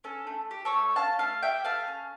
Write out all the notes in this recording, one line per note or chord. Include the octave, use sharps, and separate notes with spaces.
C#4 A4
A3
G4
A4 C#5
A3
C#4 F5 A5
A3 F5 A5
G4 E5 G5
A3 F5 A5
C#4